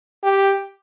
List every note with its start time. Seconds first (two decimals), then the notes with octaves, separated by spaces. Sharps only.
0.24 G4